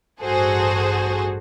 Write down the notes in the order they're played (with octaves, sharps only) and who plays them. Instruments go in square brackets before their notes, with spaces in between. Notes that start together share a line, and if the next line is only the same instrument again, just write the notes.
[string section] A1 G2 F#4 G#4 A4 C5